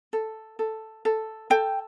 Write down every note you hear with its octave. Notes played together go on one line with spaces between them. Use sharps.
A4
A4
A4
A4 G5